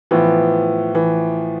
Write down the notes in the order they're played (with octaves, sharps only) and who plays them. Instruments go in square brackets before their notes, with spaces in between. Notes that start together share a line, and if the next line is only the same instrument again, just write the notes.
[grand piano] A2 F3 B3 [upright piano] E3
[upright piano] E3